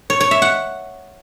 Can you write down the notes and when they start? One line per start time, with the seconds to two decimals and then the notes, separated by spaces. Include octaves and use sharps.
0.10 C#5
0.20 C#5
0.31 E5
0.42 F#5